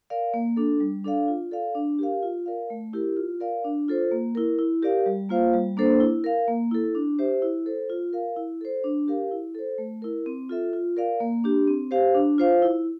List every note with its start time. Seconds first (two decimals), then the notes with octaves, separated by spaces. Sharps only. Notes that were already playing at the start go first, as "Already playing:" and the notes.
0.10 A#4 D5 F5
0.34 A#3
0.57 D4 A4
0.80 G3
1.04 D4 A4 D5 F5
1.28 F4
1.51 A4 D5 F5
1.75 D4
1.99 G4 A#4 F5
2.23 F4
2.46 A#4 D5 F5
2.70 A3
2.93 E4 G4 A#4
3.17 F4
3.40 A#4 D5 F5
3.64 D4
3.88 F4 A4 C5
4.11 A#3
4.35 E4 A#4
4.59 E4
4.83 G4 A#4 D5 F5
5.06 G3
5.29 A#3 F4 C5 F5
5.53 G3
5.77 A#3 D4 A4 C5
6.00 E4
6.24 A#4 F5
6.48 A#3
6.71 E4 A4
6.95 D4
7.19 G4 C5 E5
7.42 E4
7.66 A4 C5
7.90 F4
8.13 A#4 F5
8.37 E4
8.61 A4 C5
8.84 D4
9.08 G4 A#4 F5
9.31 E4
9.55 A4 C5
9.78 A3
10.02 E4 A#4
10.26 C4
10.49 F4 A4 E5
10.73 F4
10.97 A#4 D5 F5
11.20 A#3
11.44 D4 G4
11.68 C4
11.91 G4 C5 F5
12.15 D4
12.38 F4 C5 F5
12.62 E4